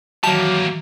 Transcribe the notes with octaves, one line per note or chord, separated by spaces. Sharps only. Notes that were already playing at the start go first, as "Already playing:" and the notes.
D#3 E3 F#3 G3 A#3 A5